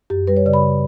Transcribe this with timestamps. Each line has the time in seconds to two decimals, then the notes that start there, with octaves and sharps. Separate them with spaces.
0.10 F#2 G4
0.27 G3 B4
0.37 C#5
0.46 C#3 D5
0.53 B5